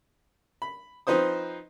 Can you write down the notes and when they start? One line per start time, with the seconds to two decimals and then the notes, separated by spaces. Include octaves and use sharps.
0.62 B5
1.07 F3 C4 D#4 B4 C5 D#6